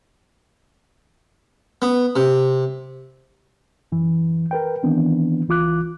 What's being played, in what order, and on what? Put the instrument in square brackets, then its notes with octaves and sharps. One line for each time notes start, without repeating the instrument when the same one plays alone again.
[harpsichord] B3
C3
[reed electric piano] F#2 E3
A#4 B4 G5
D#3 E3 B3 C4 D4
C#2 E3 F4 D6 F#6